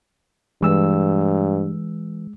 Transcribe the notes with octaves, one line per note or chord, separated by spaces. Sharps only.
G2 E3 G#3 E6